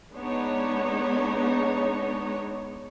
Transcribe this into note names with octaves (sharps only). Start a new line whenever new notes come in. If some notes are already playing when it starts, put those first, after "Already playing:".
G#3 B3 D4 D#4 C#5